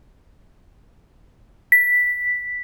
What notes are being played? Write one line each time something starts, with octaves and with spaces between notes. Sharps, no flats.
B6